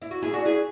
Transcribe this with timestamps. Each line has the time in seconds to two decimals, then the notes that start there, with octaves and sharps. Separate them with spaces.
0.02 E4
0.11 F#4
0.22 E4 G#4
0.33 D4 F#4
0.45 E4 G#4